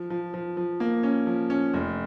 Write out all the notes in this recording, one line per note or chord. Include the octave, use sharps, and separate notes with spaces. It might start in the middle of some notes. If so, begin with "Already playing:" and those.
Already playing: F3
F3
F3
F3
A#3
C#4
F3
C#4
F1